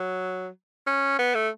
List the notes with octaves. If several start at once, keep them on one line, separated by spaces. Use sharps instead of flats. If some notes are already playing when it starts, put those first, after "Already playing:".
Already playing: F#3
C#4
B3
A3